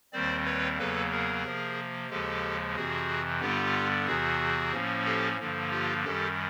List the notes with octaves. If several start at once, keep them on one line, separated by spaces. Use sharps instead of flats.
D#2 D#3 G3 C4 C5 D5
B4 C#5
E2 C#3 F#3 A#3 A4 B4
G#4 A#4
C3 F3 A#3
D#2 C#3 F3 G#3 G4 A4
F2 C3 E3 F#4 G#4
G2 D3 G3 B3 F4 G4
E2 C3 E3 F#4 G#4
A2 F3 A#3 C#4
G4 A4
G2 D3 F3 A#3
F4 G4
F#2 D#3 G3 G4 A4